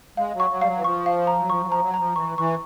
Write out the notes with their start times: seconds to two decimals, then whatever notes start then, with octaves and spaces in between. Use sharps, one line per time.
0.17 G#3 F5
0.34 F#3
0.40 C#6
0.51 F#3
0.61 G3 F5
0.67 F#3
0.77 E3
0.84 F3 C#6
1.06 F5
1.27 A#5
1.39 F#3
1.49 F3 C#6
1.62 F#3
1.66 F3
1.72 A#5
1.82 F#3
1.94 F3 A#5
2.16 E3 C#6
2.38 E3 C#6